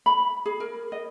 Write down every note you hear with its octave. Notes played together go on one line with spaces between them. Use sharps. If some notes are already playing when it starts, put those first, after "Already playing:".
B5
G#4
A#4
D#5